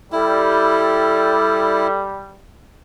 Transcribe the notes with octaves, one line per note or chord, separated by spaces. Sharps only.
G3 E4 A4